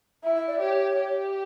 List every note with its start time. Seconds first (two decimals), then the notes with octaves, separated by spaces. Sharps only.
0.23 E4 E5
0.35 E5
0.47 D5
0.60 G4 C#5
0.96 G4